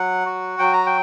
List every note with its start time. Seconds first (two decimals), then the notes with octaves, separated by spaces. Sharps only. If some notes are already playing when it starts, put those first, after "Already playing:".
Already playing: F#3 F#5
0.26 F#4
0.59 F#3 G5
0.73 A#5
0.86 G5